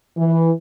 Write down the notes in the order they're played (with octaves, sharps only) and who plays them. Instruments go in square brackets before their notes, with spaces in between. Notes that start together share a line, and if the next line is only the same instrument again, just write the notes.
[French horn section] E3